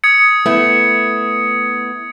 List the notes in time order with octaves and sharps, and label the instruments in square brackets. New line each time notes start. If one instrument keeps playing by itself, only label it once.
[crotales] D#6 G#6 C#7
[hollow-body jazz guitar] A3 B3 E4